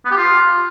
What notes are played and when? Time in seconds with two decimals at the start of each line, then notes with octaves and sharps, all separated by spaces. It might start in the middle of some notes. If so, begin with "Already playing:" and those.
0.05 B3
0.11 G4
0.17 F4